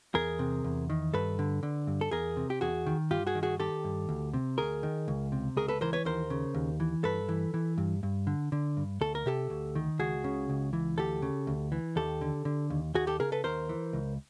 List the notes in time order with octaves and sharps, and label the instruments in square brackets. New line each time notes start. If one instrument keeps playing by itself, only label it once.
[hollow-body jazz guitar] E2 G#4 A#4
C3
E2
D#3
G2 A4 B4
D3
D3
G2
A4
E2 G#4 A#4
C3
G4
E2 F#4 G#4
D#3
G2 F4 G4
F#4 G#4
D#3
F#4 G#4
D#3 G4 A4
G2
D2
C3
D2 G#4 A#4
D#3
C#2
C3
C#2 G#4 A#4
A4 B4
E3 A#4 C5
B4 C#5
D#2 A#4 C5
C#3
D#2
E3
G2 A4 B4
E3
E3
G2
G2
D3
D3
G2
D2 A4
A#4
C3 G4 A4
D2
D#3
C#2 F#4 G#4
C#3
C#2
E3
D2 G4 A4
C#3
D2
E3
D#2 G4 A4
D3
D3
D#2
D#2 F#4 G#4
G4 A4
C#3 G#4 A#4
A4 B4
D#2 A#4 C5
E3
C#2